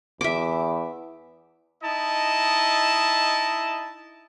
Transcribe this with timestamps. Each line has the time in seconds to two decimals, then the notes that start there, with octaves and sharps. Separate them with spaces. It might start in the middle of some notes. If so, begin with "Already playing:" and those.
0.21 E2 E5 D6
1.82 D#4 E4 D#5 A5